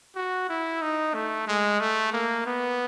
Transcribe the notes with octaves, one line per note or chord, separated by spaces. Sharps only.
F#4
E4
D#4
A3
G#3
A3
A#3
B3